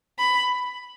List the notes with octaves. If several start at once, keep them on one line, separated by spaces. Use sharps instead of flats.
B5